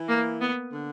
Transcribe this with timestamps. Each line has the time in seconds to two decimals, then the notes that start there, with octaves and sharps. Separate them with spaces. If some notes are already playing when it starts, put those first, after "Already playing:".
Already playing: E3
0.08 A#3
0.41 B3
0.71 D3